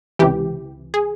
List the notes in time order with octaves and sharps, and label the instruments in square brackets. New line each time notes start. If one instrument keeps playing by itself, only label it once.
[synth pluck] C#2 C3 E3 G4
G#4